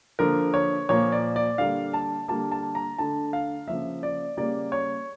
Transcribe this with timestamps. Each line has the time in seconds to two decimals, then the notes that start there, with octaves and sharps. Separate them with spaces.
0.19 D3 F3 A#3 A#4
0.54 C#5
0.89 A#2 F3 A#3 C#5
1.12 D5
1.36 D5
1.58 D3 G3 A#3 F5
1.93 A5
2.28 D3 G3 A#3 A5
2.51 A5
2.75 A#5
2.98 D3 A3 A5
3.33 F5
3.67 C#3 F3 A#3 E5
4.03 D5
4.37 C#3 G3 A#3 D5
4.72 C#5